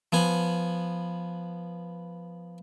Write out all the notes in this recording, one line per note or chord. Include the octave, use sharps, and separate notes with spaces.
F3 B3 G#5